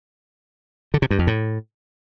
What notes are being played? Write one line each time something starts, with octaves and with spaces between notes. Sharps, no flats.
D3
C3
G2
F2
A2